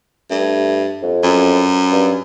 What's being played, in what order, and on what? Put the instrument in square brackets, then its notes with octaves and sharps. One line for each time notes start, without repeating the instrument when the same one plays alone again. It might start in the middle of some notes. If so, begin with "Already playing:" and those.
[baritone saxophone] G2 [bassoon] A3
[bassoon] F2
[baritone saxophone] F#2
[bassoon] G2